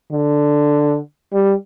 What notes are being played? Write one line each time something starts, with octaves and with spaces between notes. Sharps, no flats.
D3
G3